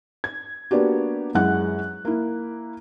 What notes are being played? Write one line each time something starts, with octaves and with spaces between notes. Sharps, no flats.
G#6
A#3 B3 D4 F#4 G4
F#2 G#3 E4 F#5 F#6
A#3 E4